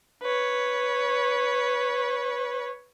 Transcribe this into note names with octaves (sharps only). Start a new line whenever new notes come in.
B4 C#5